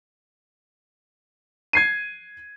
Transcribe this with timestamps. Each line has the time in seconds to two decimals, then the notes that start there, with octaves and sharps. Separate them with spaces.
1.73 G#6 C7 D#7